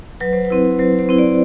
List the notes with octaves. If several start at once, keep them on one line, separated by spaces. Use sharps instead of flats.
F#3 B4
C5
B4
C4 E4
F#3 C5
C5
C4 E4
D5